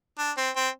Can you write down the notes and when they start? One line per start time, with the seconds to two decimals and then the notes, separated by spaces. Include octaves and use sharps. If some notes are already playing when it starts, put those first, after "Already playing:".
0.18 D4
0.37 C4
0.56 C4